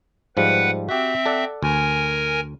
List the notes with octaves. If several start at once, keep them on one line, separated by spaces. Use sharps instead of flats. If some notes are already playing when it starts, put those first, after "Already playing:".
G#2 F3 G3 B4 F#5
C4 F#4 G4 E5
A4 D5 F#5
D2 A#4 G#5